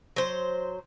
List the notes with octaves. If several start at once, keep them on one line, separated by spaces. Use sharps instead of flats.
F#3 C5